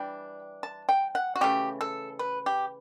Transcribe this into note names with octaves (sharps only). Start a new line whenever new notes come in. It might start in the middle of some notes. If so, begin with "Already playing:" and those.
Already playing: E3 G3 D4 G5
A5
G5
F#5
F#4
C#3 E3 A3 G4
A4
B4
G4